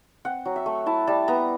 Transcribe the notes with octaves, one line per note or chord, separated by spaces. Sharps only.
C4 F#5
F#3
E5
A3
E4 A5
G3 A5
B3 A#5